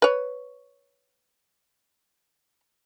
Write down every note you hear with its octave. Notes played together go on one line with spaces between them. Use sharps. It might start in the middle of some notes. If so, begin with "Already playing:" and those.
B4 C#5